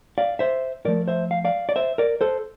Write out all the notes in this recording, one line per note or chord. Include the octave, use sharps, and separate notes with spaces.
D5 F5
C5 E5
A2 F3 A3 A#4 D5
C5 E5
F5
D5 F5
D5
C5 E5
A#4 D5
A4 C5